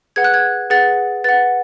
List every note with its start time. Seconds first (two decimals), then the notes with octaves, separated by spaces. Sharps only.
0.16 G#4 B4 F#5 G#6
0.24 F#6
0.34 G#6
0.70 G#4 B4 F#5 A6
1.24 B4 F#5 A6